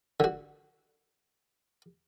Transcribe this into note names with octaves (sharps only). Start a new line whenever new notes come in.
D3 F#4